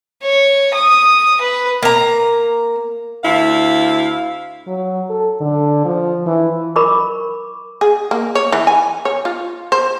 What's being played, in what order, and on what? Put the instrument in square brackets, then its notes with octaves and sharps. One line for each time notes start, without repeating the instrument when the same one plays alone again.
[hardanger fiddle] C#5
D#6
B4
[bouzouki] A#3 A#5
[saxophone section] D2 E4 F5
[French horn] F#3
A4
D3
F3
E3
[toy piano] A#4 B5 C#6 D6
[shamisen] G#4
A#3
C#5
E3
G#5
C#5
F4
C5